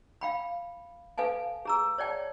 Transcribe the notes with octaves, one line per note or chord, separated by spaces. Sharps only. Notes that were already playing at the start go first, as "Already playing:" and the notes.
F5 G5 B5
A4 B4 F5 G#5 A5
G#4 A#5 E6
C#5 D5 G5 A5